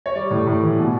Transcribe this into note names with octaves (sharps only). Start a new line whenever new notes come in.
C#5
G3 D5
A2
A2
E3
B2